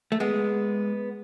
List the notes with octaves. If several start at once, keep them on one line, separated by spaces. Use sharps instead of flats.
A3
G#3 B3